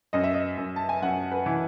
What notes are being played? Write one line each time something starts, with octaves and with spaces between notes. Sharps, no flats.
F#2 D#5
E5
D#5
F#2
A5
G#5
F#2 F#5
B4
E3